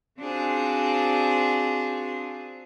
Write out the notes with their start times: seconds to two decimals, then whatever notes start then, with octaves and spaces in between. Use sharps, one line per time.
0.20 C4 D4 F4 F#4 G#4 C5